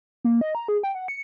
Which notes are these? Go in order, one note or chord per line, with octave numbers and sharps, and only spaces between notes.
A#3
D#5
A#5
G#4
G5
F#5
C#7